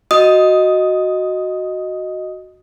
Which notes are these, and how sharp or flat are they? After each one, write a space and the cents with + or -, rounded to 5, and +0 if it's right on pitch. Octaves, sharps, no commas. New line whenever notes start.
F#4 +0 D#5 +0 D#6 +10